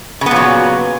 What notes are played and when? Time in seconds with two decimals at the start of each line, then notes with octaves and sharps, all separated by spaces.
0.21 C#3
0.26 B3
0.31 A#2
0.36 F#3